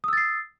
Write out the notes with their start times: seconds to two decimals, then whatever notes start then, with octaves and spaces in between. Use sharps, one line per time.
0.04 D#6
0.08 E6
0.13 A6
0.17 C7